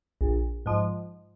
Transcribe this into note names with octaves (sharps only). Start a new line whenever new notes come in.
A#1
G#2 F3